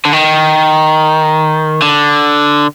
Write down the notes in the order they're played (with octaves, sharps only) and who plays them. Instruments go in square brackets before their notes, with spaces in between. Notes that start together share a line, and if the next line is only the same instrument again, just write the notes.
[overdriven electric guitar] D3
D#3
D3